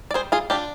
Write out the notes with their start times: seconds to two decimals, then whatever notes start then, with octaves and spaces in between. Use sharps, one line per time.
0.11 D5
0.14 G3 G#4 C5
0.32 F4 G#4
0.50 D4 F4 G4